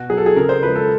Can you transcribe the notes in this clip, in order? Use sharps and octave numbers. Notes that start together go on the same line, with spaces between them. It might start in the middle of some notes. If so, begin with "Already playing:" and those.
Already playing: B2 F#4
F#3 G#4
A4
G#4
C#3 A#4
C5
F3 G#3 B4
A4